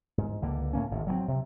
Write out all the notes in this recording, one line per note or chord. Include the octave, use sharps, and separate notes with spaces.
G#2
C#2 D3 A#3
A2 A#3 C#4
G#1 A2
F#3 G3 C4
C3